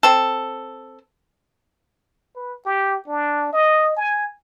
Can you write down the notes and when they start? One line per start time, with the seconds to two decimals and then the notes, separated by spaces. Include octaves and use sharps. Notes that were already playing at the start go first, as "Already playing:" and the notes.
0.03 C4 A4
2.35 B4
2.66 G4
3.07 D4
3.53 D#5
3.96 G#5